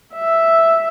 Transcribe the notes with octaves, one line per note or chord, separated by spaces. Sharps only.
E5